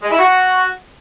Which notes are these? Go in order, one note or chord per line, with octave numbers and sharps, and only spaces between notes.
G#3
E4
F#4